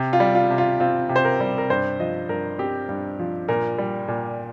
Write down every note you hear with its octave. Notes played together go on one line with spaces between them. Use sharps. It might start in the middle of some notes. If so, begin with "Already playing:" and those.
Already playing: C3
F4
G3
F4
C3
F4
C4 F4
C3
C5
A#4
G3
A#4
G2 C5
F3 D#5
G2 A#4
C4 G4
G2
F3
A#2 A#4
G3
A#2